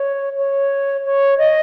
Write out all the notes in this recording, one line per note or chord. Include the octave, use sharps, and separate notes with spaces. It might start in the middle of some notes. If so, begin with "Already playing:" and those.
Already playing: C#5
C#5
C#5
D#5